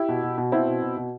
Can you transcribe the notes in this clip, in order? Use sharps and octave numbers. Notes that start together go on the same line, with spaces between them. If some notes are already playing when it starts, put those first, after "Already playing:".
Already playing: E4 G4
B2
B2
B2
B2 C4 E4
B2
B2
B2